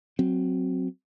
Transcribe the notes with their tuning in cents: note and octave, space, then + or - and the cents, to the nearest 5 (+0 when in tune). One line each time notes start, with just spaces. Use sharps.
F#3 +0 C4 +0